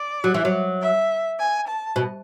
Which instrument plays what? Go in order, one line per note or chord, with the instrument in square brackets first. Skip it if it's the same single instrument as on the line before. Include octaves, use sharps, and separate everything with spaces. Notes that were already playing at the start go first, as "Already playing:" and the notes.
Already playing: [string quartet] D5
[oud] F#3
E3
F#3
[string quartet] E5
G#5
A5
[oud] B2